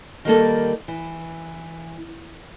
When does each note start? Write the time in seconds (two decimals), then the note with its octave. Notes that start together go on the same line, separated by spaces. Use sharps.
0.25 D#3 G3 A#3 A4
0.88 E3